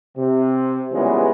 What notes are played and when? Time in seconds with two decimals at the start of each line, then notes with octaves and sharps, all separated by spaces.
0.18 C3
0.93 A#2 C#3 E3 G3 G#3 B3